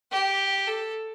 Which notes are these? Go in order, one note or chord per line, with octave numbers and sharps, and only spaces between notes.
G4
A4